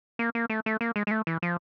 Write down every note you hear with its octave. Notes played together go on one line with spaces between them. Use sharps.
A#3
A#3
A3
A3
A#3
G#3
G#3
A3
E3
F3